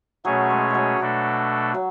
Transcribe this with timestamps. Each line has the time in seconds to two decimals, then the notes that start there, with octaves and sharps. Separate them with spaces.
0.25 B2 F#3 A3 C#4 G#4 C#5
0.50 G#3
0.70 F#3 G#3
0.99 B2 A3 D4 F#4 A4
1.74 F#3